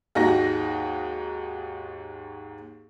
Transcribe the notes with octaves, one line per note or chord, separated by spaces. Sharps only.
D#2 G#2 D#4 F#4 A#6